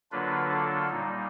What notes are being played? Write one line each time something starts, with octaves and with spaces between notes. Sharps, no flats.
D3 F#3 A#3 D4 F4 B4
A4
A#2 G3 A#3 D#4